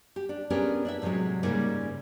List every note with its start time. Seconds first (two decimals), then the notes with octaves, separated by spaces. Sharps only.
0.16 G4
0.29 D4
0.50 B3 C#4 D4 G4 G#4 A#4
0.85 D4 E4 E5
1.02 A2 C3 F3 F#3 G#3
1.43 G#2 C#3 G3 A#3 D#4